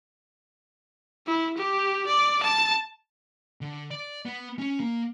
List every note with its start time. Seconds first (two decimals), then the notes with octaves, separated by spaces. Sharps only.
1.27 E4
1.58 G4
2.06 D5
2.43 A5
3.61 D3
3.91 D5
4.25 B3
4.59 C#4
4.80 A#3